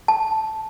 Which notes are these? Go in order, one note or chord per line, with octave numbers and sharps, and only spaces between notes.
A5